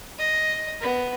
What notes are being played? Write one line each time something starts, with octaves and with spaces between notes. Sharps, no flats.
D#5
B3